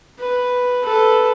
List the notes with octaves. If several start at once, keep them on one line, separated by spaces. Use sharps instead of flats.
B4
A4 B4